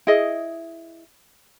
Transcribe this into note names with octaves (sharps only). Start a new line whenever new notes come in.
E4 G#4 D#5